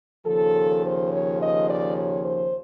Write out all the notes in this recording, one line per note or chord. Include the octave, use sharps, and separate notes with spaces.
D#2 C#3 F3 A4
C5
C#5
D#5
D5
C#5
C5